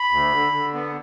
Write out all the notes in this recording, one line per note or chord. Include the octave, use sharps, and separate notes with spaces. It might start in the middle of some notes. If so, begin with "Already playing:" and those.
Already playing: B5
D2
D3
D3
B3